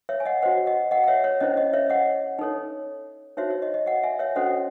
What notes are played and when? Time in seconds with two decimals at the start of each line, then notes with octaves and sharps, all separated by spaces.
0.09 C#5 E5
0.20 G#5
0.25 D#5 F#5
0.42 F#4 C5 D#5 F#5
0.66 D#5 F#5
0.91 D#5 F#5
1.04 F#5
1.08 C#5 E5
1.24 C#5
1.40 C#4 E4 C5 D#5
1.57 D#5
1.73 C#5 E5
1.90 D#5 F#5
2.39 D#4 A4 C#5
3.37 D#4 F#4 C5 C#5 E5
3.50 C#5
3.62 D#5
3.74 D#5
3.86 D#5 F#5
4.03 E5 G#5
4.19 C#5 E5
4.36 C#4 F#4 A4 C5 D#5 F#5